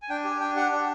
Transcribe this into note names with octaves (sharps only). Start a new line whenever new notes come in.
G#5
D4 G5
G4
G#5
D4 G5
G4 F#5
D4